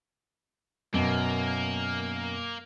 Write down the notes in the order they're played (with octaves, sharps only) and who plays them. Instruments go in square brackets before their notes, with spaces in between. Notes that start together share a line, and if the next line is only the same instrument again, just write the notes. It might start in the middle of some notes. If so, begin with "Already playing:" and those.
[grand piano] F#2 B2 [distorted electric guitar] A#3